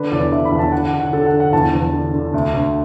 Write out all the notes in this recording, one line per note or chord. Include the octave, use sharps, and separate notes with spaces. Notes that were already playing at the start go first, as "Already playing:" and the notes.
Already playing: D3 B4
E2 D5
D3 E5
B5
E2
A5
D3 F#5
F#5
D3
F#5
D3 A4
F#5
D3
F#5
E2 A5
E2
D3
D3
D2
D2